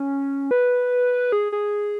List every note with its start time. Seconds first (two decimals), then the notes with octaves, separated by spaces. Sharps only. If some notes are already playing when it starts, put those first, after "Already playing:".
Already playing: C#4
0.51 B4
1.32 G#4
1.52 G#4